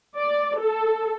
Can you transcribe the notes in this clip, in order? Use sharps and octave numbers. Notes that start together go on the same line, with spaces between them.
D5
A4